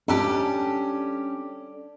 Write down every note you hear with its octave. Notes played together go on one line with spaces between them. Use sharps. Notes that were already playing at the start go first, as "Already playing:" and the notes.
G3 C#4 D4 G4 A4